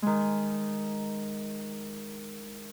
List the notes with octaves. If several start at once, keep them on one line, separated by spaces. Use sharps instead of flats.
D#3 G#3